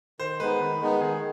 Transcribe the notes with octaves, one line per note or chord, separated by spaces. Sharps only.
D#3 C5
G#3 B3 D#4 B4
D#3
G#3 B3 D#4
D#3 G#4